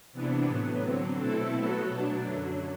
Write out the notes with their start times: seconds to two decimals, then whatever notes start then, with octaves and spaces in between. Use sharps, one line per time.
0.13 C3 E3 B3 D4
0.48 A2 F#3 B3
0.83 D3 F#3 C4
1.18 B2 A3 C4 E4 A4
1.53 F#3 B3 F#4 A4
1.89 B2 F#3 A3 D4
2.24 F#2 D3 F#3